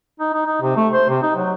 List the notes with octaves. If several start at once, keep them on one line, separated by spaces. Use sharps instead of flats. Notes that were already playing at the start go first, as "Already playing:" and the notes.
D#4
D#4
D#4
C3
A3
C5
C3
D#4
F#3